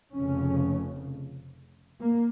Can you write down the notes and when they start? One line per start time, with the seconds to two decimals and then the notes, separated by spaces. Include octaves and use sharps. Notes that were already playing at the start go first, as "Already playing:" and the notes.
0.16 F1 F2 C#3 C#4
2.00 A#3